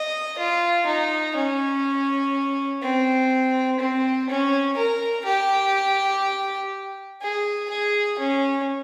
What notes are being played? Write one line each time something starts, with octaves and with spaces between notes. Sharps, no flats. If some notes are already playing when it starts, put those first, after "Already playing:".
Already playing: D#5
F4
D#4
C#4
C4
C4
C#4
A#4
G4
G#4
G#4
C#4